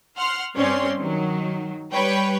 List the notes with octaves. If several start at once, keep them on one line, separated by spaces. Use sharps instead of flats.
F#5 C6 F6
G2 C4 C#4 C#5 D5 C6
D#3 F#3
G3 B4 C#5 G5